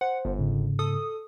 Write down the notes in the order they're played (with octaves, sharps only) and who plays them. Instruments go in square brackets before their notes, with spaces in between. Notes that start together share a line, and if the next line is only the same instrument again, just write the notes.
[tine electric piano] C5 [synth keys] F#5
[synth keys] G1
[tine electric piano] G#2 C#3
[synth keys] A4 D#6